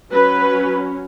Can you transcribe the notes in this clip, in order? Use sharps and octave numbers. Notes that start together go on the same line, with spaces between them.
F#3 C#4 B4